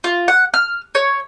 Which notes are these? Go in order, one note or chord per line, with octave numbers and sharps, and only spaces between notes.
F4
F#5
F6
C#5